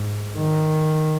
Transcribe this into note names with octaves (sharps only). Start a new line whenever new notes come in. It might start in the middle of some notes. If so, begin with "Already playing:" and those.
Already playing: G#2
D#3